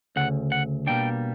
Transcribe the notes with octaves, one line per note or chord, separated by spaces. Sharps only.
D2 C#3 F#5
F#5
B2 G3 A#3 D4 G5